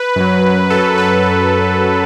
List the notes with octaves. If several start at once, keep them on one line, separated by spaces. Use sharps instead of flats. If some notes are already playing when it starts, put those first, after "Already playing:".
Already playing: B4
F#2 F#3
F#2 F#3 A4
B4